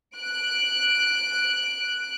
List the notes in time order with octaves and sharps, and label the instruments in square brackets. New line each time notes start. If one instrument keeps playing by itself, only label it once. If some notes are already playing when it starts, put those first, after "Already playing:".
[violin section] F#6 D7